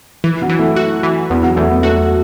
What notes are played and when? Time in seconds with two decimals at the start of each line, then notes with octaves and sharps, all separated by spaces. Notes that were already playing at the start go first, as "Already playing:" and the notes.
0.24 E3
0.42 F#3
0.49 E3
0.59 A3
0.76 F#4
1.03 E3
1.30 E2 B3
1.43 F#3
1.56 E2 A3
1.70 B3
1.83 A3 F#4